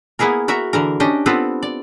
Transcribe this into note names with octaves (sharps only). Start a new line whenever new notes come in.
A#3 B3 E4 G#4 A#4
F#4 A#4 E5
D3 E3 A#4
C#4 D4 G4 D#5
B3 C4 F4 A4 B4
D5